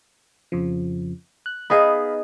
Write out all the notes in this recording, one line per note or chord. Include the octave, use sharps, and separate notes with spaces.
F2 C#3 F3
F#6
B3 D#4 G#4 D#5 F5 B5